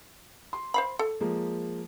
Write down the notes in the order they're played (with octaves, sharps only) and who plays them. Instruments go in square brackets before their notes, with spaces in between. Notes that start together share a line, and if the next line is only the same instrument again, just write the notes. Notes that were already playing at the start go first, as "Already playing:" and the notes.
[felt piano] C6
[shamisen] C5 F5 B5
A4
[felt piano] F3 G#3 A#3